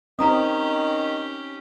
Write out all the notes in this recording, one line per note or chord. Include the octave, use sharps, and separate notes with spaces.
D#3 C4 C#4 D#4 G4 D#5 A#5 D#6